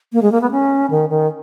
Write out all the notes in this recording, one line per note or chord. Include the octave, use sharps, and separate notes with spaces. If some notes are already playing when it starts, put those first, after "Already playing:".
A#3
G#3
A#3
B3
C#4
D#3
D#3